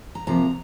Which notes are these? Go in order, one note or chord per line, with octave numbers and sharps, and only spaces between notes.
A#5
C3 F3 A#3 A#5